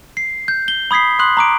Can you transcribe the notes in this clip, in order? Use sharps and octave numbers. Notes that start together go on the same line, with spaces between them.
C7
G6
G7
B5 D#6 G#6 B6 C7
C6 D#6 F#6 F#7
A#5 D6 D7